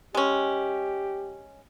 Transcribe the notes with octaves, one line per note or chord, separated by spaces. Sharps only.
G#3 C#4 G4